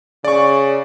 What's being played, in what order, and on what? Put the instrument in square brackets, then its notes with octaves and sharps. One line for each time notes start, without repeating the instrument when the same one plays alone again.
[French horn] C#3 [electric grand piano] D5 C#6